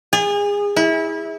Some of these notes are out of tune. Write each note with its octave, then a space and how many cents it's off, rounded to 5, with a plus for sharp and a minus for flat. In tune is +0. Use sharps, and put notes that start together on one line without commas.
G#4 -30
E4 -25